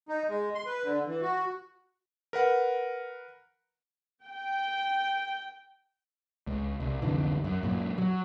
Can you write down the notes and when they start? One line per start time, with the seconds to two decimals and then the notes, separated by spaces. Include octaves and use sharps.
0.09 D#4
0.29 G#3
0.55 C6
0.66 B4
0.83 D3
1.07 E3
1.22 F#4
2.33 A#4 B4 F#5
4.25 G5
6.47 C#2
6.80 C2
7.02 C2 F2 D3 E3
7.44 F#2
7.63 F#2 A#2
7.98 F#3